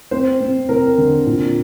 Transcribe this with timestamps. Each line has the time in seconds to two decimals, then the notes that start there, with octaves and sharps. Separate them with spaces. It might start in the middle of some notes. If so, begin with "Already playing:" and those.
0.11 C4 C5
0.40 C4
0.69 C4 A#4
0.98 D3
1.26 A#2